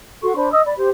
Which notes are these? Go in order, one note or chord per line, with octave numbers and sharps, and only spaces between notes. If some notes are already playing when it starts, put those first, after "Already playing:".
F#4 A4 C6 C#6
D4 C5 B5
D#5 D#6 E6
D5 B5
G4 C5